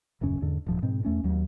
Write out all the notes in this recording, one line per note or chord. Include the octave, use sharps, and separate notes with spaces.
D#1 F#2 C#3 C#4
E2 G#2 D3
D#1 G#2 F3
G#2 B2 C4
E2 A3 C#4
D#2 F#3